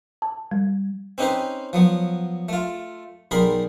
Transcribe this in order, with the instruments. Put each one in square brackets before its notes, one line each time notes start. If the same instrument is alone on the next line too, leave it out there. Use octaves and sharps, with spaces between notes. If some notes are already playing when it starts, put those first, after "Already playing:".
[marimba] A5
G3
[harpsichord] C4 C#4 D#4 G4 B4 C5
F3 F#3 B3
A3 F4
B1 G3 G#4 A#4 B5 C6